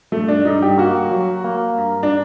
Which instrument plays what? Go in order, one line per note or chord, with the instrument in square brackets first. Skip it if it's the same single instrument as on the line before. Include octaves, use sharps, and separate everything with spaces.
[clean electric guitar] G2 [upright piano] A3
[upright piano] D4
[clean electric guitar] G2 [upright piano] D#4
[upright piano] G4
[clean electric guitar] A#3 [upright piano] F#4
[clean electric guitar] F#3
A#3
G2
[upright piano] D4